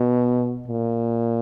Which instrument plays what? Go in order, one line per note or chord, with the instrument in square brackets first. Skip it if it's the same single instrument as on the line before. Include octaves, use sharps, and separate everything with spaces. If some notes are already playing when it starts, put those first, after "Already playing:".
Already playing: [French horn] B2
A#2